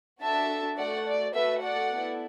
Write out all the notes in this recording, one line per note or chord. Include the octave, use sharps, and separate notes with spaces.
D4 F#4 A4 E5 A5
A3 F#4 A4 D5 F#5
D5
A3 F#4 A4 B4 E5
D5 F#5
B3 E4 A4